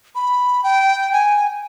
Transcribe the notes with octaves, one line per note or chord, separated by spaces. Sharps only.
B5
G5
G#5